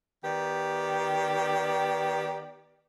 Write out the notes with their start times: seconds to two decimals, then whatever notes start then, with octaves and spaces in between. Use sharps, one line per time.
0.24 D#3 B3 G4 D5